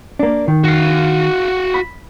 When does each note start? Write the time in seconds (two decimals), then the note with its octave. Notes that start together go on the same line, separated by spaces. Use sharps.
0.19 A#3 D4
0.48 D#3
0.64 F#4 F5
1.74 B5